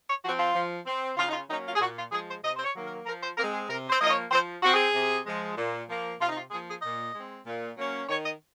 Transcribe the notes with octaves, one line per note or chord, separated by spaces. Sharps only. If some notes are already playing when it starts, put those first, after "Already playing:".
C#5
F3 C4 F#4
F4
F3
C4
C#3 F4
D#4
F4
F#3 A#3 C#4 D#4
F4
G#4
A#2 F#4
F4
F3 G#3 G#4
C5
C3 D#5
C5
C#5
D#3 F#3 A#3
A#4
F3 A#4
C5
G#3 C4 A#4
G#4
C3 A#4
C5
F3 A#3 D#5
C#5
F3 C5
C4 F#4
G#4
C3
F3 G#3
A#2
F3 A#3
C3 F4
D#4
F4
F3 A#3 G#4
G#4
A#2 D#5
G#3 C4
A#2
F#3 A#3 C#4
D#3 C#5
D#5